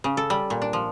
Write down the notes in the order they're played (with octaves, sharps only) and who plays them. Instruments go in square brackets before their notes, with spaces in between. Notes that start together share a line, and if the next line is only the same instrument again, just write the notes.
[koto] C#3
A4
G3
A#2
D4
F3